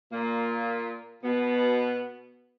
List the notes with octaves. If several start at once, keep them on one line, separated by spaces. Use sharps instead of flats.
A#2 A#3
B2 B3